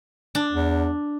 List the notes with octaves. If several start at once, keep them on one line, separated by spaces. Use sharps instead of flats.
D4
E2